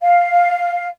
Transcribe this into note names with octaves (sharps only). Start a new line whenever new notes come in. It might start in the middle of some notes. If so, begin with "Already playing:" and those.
F5